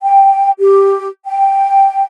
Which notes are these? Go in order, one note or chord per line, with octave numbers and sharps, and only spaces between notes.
G5
G4
G5